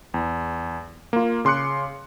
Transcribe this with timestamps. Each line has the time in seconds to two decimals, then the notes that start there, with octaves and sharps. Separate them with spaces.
0.14 E2
1.13 A#3 F4
1.45 C#3 C6 D6 F#6 C#7